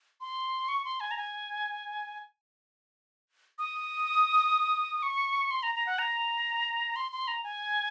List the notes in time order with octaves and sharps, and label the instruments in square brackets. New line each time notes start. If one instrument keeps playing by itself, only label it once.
[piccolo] C6
C#6
C6
G#5
A#5
G#5
D#6
C#6
C6
A#5
A#5
F#5
A#5
C6
C6
A#5
G#5